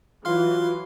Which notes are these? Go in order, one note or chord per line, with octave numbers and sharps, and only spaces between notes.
E3 F#3 F4 F5 C6 F6